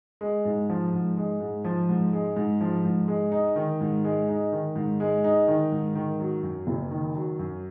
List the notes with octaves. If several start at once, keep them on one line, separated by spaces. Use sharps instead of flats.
G#3
G#2
F3
G#2
G#3
G#2
F3
G#2
G#3
G#2
F3
G#2
G#3
D#4
D#3
G#2
G#3
D#4
D#3
G#2
G#3
D#4
D#3
G#2
D#3
F#3
F#2
F#1
D#3
F#3
F#2